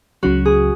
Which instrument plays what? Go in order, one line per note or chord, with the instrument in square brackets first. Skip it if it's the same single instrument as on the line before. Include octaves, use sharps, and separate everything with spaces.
[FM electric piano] C#2 C#3 F#3 [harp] F#4
[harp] G#4